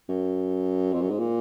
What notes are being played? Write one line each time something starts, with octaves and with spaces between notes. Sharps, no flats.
F#2
F2
F#2
G#2
A#2